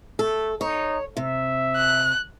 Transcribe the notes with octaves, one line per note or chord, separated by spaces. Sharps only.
A3 A4
D#4 C#5
C3 E5
F#6